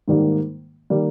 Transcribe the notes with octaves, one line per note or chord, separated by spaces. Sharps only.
G#2 D#3 G3 A#3
D#3 G3 A#3